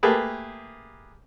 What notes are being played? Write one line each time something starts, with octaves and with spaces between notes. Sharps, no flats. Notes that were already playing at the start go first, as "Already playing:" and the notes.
A3 A#3 G4 G#4 B4 A5